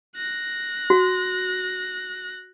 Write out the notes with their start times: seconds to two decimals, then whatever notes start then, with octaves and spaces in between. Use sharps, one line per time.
0.16 F#6 A#6
0.90 F#4